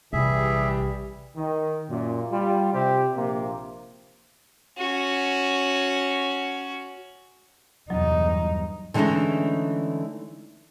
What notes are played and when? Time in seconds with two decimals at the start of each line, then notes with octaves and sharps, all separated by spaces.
0.13 A#1 C3 E3 G3 G#4 E5
1.36 D#3
1.89 F#2 A#2
2.31 G3 F4
2.74 C3 C4 G4
3.16 A#1 C3 A#3
4.78 C#4 F#4
7.90 E2 G2 F#3 D#4
8.94 D3 E3 G#3 A3 C#4 D#4